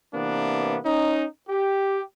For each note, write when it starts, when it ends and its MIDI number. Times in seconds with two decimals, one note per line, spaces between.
0.14 0.78 48
0.14 0.78 52
0.14 0.78 58
0.14 0.78 59
0.14 0.78 62
0.84 1.24 61
0.84 1.24 63
1.49 2.02 67